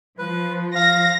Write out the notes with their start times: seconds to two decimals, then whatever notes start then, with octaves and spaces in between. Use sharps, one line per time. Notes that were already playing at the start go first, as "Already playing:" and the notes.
0.19 F3 B4
0.75 F5 A#6